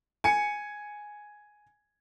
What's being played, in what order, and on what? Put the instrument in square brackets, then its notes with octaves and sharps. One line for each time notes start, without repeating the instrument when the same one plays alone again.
[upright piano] G#5 C#7